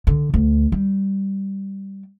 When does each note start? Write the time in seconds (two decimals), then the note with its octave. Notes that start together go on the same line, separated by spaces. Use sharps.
0.07 D3
0.34 D2
0.72 G3